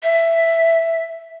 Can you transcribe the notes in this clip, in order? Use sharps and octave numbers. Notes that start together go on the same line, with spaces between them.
E5